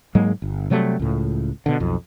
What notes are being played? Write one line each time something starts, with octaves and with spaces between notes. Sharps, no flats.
G#2 F#3 G#3 A#3
G1
C3 F#3 G3 A3
C#2 A2
B2 D3
B1 F2